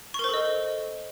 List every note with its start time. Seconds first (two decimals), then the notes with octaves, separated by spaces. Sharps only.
0.14 C#6
0.19 A#4
0.24 C5
0.29 A4
0.34 D#5